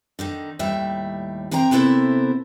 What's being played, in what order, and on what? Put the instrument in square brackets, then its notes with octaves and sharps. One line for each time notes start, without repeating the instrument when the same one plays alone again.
[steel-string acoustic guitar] D3 D#3 D#4
D#2 A2 G3 E5
C3 A#4 C5 G5 A#5
C3 B3 E4 A4 A#4 C5